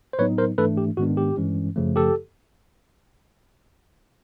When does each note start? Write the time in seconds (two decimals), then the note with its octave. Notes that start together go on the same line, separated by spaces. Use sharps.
0.13 C5
0.19 A2 F#3 B3 D#4 B4 C#5
0.38 A#4 C5
0.58 G#2 E3 A3 D4 A4 B4
0.77 G4
0.97 G#2 D#3 G#3 B3 D4 F#4
1.17 G4
1.37 G2 E3 G#3 C#4
1.76 F#2 C#3 F3 A3
1.96 G4 A4